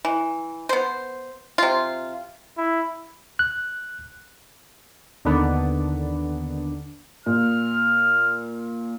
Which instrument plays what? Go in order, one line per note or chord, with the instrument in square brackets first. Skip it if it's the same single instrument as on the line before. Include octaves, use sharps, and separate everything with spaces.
[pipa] E3
B3 C5
C3 F4
[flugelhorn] E4
[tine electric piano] F#6
[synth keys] D#2 D3 D#3 B3 D4
[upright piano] A#2 [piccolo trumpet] F6